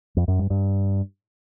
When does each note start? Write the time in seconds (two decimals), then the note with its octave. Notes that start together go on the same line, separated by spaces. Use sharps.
0.17 F2
0.28 F#2
0.39 G2
0.50 G2